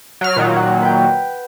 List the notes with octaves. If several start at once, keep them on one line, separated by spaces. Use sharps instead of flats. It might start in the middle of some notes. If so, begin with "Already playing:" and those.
F#3 F6
A#2 D#3 F#3
F#5
B4 G5